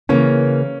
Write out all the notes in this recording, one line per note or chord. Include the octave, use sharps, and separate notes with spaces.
C#3 E3 A#3 C#4